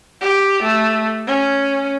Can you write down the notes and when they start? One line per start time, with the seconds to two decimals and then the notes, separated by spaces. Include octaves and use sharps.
0.21 G4
0.63 A3
1.27 C#4